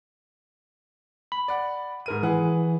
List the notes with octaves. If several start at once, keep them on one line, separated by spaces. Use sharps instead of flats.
B5
D5 F#5
G#2 A#4 D#7
E3 G#4 B4 F#5